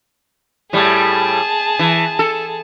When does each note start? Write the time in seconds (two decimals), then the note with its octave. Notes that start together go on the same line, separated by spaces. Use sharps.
0.73 A2 G3 G#4 A5
1.79 E3
2.19 A4